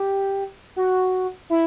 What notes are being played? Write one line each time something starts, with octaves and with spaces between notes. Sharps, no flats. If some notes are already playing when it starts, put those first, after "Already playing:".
Already playing: G4
F#4
E4